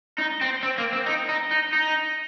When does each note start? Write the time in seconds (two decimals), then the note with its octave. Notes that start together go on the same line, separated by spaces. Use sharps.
0.18 D#4
0.41 C4
0.63 C4
0.78 A#3
0.93 C4
1.06 D#4
1.29 D#4
1.51 D#4
1.73 D#4